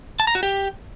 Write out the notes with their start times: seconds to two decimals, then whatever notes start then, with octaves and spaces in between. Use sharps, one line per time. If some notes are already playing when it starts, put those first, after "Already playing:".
0.20 A5
0.27 A#5
0.35 F#4
0.43 G4